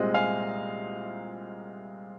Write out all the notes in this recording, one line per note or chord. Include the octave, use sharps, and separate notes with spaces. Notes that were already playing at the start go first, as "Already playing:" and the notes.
Already playing: C2 A#2 G#3 C4 D#5
F5 G#5